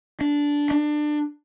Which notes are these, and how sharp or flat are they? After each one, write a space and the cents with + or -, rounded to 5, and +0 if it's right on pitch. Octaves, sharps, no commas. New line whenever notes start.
D4 -10
D4 +25